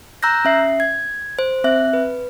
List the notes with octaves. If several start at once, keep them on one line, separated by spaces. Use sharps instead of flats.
A#5 E6 F#6 G6 A#6
C#4 E5 C7
G#6
C5
C4 E5 F#6
B4